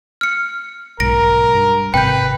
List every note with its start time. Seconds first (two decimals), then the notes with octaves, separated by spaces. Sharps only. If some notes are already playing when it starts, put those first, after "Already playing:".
0.21 F6 C#7
1.00 B1 G#2 A#4 A#6 D7
1.54 G2
1.94 G#1 C3 B4 G5 G6